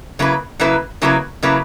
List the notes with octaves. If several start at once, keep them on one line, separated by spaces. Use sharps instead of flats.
C#3 F#3 A#3 E4 B4
C#3 F#3 A#3 E4 B4
C#3 F#3 A#3 E4 B4
C#3 F#3 A#3 E4 B4